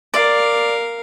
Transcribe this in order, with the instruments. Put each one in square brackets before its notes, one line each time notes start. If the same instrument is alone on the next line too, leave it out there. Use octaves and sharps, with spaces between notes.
[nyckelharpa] A#4 F5 [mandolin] D5